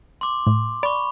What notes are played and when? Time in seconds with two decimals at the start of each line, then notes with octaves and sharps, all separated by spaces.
0.21 C6 D6
0.47 A2
0.83 D5 B5 C#6